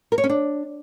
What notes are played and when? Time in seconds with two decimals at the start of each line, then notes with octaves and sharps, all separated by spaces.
0.12 A#4
0.18 C#5
0.24 C#4
0.29 D4